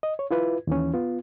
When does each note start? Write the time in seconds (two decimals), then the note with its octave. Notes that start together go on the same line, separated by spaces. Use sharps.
0.03 D#5
0.19 C#5
0.31 E4 F4 B4
0.67 D#2 E3 C#4
0.94 B3 F4